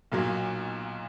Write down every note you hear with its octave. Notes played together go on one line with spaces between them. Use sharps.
B1 A#2 F#3